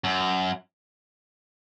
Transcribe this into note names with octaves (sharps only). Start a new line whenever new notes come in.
F#2